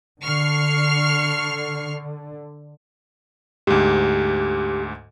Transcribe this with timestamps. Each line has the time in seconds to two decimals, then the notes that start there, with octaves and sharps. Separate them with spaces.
0.23 D3 C#6 F6 C7
3.67 D2 G#2 G4